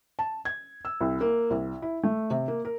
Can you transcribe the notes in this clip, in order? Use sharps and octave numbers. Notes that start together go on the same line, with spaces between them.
A5
G#6
E6
C2
A#3
C2
E4
A3
C3
A#3
A#4